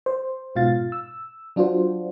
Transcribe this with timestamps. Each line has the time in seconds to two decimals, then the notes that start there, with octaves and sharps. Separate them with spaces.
0.06 C5
0.56 G#2 B2 F4 F5 A6
0.92 E6
1.56 F#3 D4 F4 F#4 C5